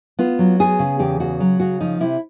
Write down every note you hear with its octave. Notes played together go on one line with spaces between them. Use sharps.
B3 F4
F#3
B3 G#4
C#3
E2 G4
C#3 F#4
F#3
C#3 F#4
F3 D#4
C3 E4